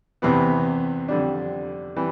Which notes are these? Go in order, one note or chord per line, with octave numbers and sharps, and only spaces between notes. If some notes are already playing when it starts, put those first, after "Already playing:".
E2 C3 E3 B3
F2 D3 G3 D4
E3 G3